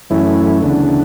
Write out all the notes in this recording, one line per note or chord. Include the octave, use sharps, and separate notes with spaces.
F#2 E3 A3 C#4 E4
D2 C#3 E3 B3 D4